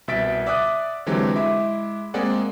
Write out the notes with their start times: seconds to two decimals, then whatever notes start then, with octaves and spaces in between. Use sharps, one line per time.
0.08 C2 B2 E5 A6 B6 D7
0.46 D5 E5 F#5 D6 D#6 F#6
1.06 D3 E3 F#3 G#3 C4 G4
1.35 G#3 E4 E5 D6
2.14 G#3 A#3 C4 G#4 D5 F#5